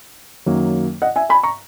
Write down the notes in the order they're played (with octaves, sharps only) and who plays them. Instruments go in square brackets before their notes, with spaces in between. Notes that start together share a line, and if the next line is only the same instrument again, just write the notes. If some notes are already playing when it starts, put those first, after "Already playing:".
[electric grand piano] F#2 D#3 F#3 A#3
[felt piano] D#5 F#5
E5 G#5
G#5 B5
A#5 C#6